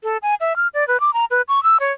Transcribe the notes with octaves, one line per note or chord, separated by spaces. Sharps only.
A4
G#5
E5
F6
D5
B4
D6
A#5
B4
C#6
E6
C#5